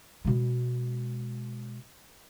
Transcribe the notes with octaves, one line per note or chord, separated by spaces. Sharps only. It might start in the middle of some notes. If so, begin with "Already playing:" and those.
B2 G#3